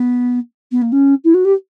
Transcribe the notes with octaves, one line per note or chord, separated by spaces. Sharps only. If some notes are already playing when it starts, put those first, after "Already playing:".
Already playing: B3
B3
A#3
C#4
E4
F#4
G4